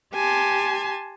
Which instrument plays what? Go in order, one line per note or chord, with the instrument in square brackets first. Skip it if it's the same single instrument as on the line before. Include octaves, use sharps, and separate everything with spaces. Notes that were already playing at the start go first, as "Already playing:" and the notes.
[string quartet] G4 G#5 A5 C6